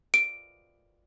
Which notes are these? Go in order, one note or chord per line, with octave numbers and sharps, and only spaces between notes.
D7